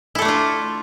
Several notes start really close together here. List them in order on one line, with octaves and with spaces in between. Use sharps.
E4 A4 A3 D4 F4